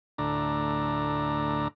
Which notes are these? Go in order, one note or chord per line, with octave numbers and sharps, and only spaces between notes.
D2 A2 D4 A#5